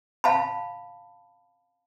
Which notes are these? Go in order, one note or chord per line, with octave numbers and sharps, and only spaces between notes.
F5 A5 B5